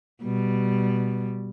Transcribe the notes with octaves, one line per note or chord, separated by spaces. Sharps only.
B2 G3